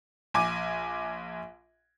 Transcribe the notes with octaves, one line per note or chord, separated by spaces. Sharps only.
A#1 G#5 D6 D#7